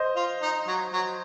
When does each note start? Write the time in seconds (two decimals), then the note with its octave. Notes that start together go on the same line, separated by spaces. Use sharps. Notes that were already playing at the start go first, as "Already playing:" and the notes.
Already playing: C5 D#5
0.16 F4
0.42 D#4
0.67 F#3
0.93 F#3